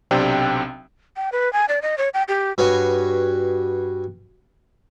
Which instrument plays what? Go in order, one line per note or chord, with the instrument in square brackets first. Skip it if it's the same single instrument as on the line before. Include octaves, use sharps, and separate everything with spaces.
[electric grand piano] B1 C3 C4 D4 G5
[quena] G5
B4
G#5
D5
D#5
C#5
G5
G4
[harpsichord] G2 F#4 B4 C#5 G#5